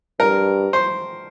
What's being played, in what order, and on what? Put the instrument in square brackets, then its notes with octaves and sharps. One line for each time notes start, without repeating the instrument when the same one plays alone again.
[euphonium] G2 [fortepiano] A#4
[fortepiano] C5